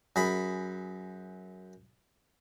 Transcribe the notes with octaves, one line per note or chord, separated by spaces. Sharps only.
F#2 G#4 B5